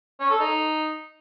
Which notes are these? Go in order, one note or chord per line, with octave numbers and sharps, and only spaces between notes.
C#4
A4
D#4